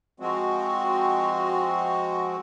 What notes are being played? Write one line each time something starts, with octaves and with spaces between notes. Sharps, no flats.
F3 G#3 C4 F#4